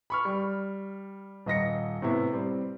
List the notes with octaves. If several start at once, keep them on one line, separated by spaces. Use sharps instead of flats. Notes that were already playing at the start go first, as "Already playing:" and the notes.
B5 C#6 F6
G3
D#1 D#5 A#6 C#7
A2 C3 B3 E4
G3 C4